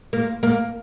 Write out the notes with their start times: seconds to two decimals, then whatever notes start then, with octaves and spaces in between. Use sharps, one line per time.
0.13 A#3
0.43 A#3